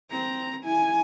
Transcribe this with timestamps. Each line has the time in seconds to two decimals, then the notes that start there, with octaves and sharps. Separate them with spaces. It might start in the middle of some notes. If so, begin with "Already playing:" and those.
0.11 C4 A#5
0.64 E4 G#5